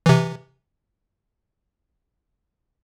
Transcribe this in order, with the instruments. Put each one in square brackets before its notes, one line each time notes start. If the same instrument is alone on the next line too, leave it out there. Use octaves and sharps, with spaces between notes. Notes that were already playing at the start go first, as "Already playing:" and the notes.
[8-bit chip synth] C3 E3